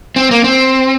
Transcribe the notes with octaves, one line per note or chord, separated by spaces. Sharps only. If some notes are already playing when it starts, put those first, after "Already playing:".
C4
A#3
C4